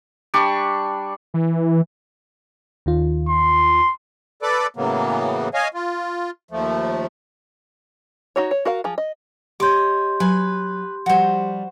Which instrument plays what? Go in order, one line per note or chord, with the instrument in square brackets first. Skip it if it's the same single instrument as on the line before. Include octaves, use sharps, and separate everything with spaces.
[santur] G3 D4 C#6
[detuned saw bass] E3
[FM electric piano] D#2 D#3 F4
[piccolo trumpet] C6
[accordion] A4 B4 D5 D6
A2 C#3 E3 F#3 A#3 B3
C#5 D#5 F5 G#5
F4
D#2 F3 A3
[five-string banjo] D#4 F#4 C#5
C#5
F#4 A#4 F5
F3 G#4
D#5
[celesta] G4 C6 G6 [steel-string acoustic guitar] C#5 D#5 [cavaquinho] D6
[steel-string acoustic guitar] F#3 [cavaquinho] B4 G#5
[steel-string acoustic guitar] F3 G3 [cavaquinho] F#4 C5